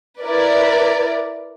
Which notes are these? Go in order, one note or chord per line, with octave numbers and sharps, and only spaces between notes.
E4 A#4 B4 D5